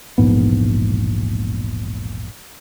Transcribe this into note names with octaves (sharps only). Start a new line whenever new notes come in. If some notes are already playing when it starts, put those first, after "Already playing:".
E1 A#1 G#2 B3